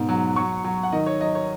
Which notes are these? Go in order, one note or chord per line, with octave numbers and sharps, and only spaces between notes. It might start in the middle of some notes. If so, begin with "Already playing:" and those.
Already playing: G#2 B2
F#3
F#3 C#6
F#3
F#5
D#3 D#5
C#5
F#3 D#5
C#5